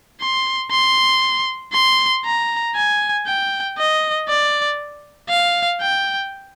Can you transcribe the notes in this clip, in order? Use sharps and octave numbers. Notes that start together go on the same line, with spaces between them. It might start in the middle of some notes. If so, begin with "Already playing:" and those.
C6
C6
C6
A#5
G#5
G5
D#5
D5
F5
G5